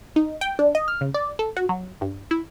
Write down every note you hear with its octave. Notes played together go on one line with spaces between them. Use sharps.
D#4
G5
D4
D#5
F6
C#3
D5
A4
F#4
F#3
G2
E4